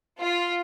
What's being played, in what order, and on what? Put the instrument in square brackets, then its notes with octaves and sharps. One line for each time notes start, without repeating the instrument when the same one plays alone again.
[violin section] F4